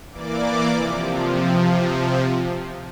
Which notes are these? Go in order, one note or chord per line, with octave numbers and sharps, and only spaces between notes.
E3 A#3 D5 D6
C3 F3